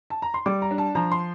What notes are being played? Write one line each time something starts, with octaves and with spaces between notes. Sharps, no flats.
A5
A#5
C6
G3 D6
A#5
D4
A5
F3 A#5
C6